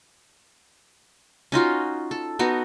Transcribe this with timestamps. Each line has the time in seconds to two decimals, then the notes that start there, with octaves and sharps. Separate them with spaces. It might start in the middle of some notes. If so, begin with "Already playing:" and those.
1.52 C#4 D#4 F4 F#4
2.11 A4
2.39 B3 D#4 F#4